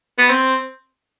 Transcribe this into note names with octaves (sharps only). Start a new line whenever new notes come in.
B3
C4